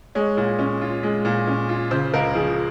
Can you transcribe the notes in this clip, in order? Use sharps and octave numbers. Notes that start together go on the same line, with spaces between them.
G#3 C#5
A#2
C#4
F4
G#3
A#2
C#4
F4
C#3 C5
C#2 A#4
F3 G#4